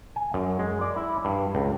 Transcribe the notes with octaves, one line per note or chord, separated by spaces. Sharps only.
G#5
F#2
G#3
D5
E4
G2
C#2